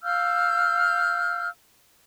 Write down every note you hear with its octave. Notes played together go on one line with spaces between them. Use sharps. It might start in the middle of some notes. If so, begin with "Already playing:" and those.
F5 E6 F6 G6